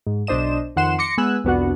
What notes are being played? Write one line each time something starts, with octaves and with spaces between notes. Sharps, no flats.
G#2
B1 D4 C5 D#5 E7
F2 D#3 F#5 C6 E7
C6 D6 A#6 C#7
G#3 B3 G#5 E6 F#6
C2 F2 B3 D4 F#4 F#5